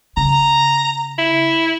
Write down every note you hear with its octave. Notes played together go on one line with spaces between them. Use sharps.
C#3 A#5
E4